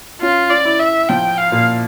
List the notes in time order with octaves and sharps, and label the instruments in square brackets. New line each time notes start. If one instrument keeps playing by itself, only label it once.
[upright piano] C#4 [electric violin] F4
[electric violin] D5
[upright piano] E4
[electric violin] E5
[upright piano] F3 [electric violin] G5
[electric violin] F5
[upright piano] A#2